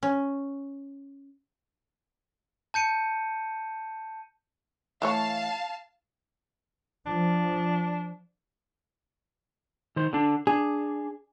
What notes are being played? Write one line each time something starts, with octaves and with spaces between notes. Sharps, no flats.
C#4
A5 G6 C#7 D#7
E3 A3 C#5 F5 A5
F3 D4
D#3 C5
D3 D4
D4 G#4